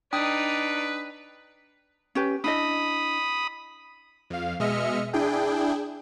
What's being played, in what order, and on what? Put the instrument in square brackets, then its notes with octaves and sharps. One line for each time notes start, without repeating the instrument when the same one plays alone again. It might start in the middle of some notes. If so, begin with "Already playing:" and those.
[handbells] D4 G5 D#6 [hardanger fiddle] D#4 D5 [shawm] B4
[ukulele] C#4 G4 B4
[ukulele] D4 E4 D#5 [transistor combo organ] B5 D#6
[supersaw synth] F2 F5
B2 G#3 D#5 E5 F6 C#7
D4 E4 G#4 G5